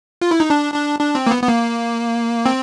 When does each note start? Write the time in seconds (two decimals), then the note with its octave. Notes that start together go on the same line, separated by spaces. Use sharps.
0.21 F4
0.31 E4
0.40 D#4
0.50 D4
0.74 D4
0.99 D4
1.15 C4
1.27 A#3
1.31 B3
1.43 B3
1.48 A#3
2.46 C4